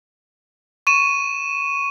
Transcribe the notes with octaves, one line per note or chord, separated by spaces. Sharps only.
C#6 D#7 E7